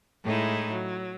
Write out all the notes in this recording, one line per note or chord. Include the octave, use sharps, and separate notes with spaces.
A2 G#3 D#4 E4
F#3